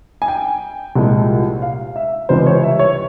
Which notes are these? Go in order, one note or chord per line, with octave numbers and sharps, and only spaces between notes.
G#5
G5
C2 A#2 F3 G#3
F5
E5
C#2 C3 E3 G3 C5
C#5
E5
C#5